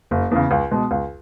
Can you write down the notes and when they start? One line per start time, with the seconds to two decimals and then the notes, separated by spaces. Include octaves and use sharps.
0.11 F#1
0.31 E2 C#3
0.51 C#2
0.71 B2 G#3
0.91 C#2